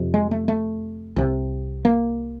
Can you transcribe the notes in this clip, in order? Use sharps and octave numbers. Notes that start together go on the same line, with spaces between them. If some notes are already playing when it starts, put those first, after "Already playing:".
Already playing: F2 C3
G#3
A3
A3
C2 C3
A#3